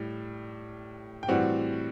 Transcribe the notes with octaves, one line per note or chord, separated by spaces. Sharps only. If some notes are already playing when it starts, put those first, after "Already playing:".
Already playing: A2 G3
G5
A2 E3 G3 C4 F#4 F#5